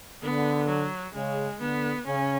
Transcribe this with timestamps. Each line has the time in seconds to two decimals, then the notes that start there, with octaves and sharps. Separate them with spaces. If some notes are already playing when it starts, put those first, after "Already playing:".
0.23 D3 B3
0.69 F#3
1.14 C#3 G#3
1.61 D3 B3
2.06 C#3 C#4